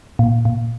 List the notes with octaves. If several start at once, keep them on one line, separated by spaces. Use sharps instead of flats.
A#2
A#2